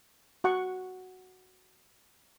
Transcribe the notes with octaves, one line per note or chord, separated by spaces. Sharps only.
F#4 F#5 C#6